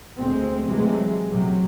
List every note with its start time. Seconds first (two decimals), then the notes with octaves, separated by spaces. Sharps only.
0.17 D2 G#3 C4
0.65 C3 E3 F#3 G#3 A3
1.29 A1 C3 F#3